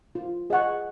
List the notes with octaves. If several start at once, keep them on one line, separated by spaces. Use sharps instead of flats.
F4
G#4 D#5 F#5 C#6